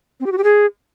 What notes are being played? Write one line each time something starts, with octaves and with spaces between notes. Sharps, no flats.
C4
G4
F#4
G4
G#4